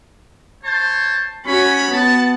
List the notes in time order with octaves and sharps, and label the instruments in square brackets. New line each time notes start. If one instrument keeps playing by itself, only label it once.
[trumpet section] C5 C#5 A5
[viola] C#4 F#4 [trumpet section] C#5 B5
[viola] B3 [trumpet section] A5